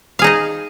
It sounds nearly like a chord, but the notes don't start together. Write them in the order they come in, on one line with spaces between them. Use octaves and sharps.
F5 G#4 D#4 D#5